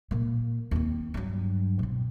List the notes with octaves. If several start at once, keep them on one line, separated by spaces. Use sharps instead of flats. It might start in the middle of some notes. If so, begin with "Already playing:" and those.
A#2 A#3
D#2 C4
G2 F#3
B2 C4